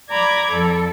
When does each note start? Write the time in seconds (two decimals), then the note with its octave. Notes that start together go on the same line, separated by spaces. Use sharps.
0.10 D5 A#5 B5 D6 G#6
0.50 F2 A4